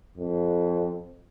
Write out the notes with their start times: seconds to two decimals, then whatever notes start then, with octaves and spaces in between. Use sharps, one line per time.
0.17 F2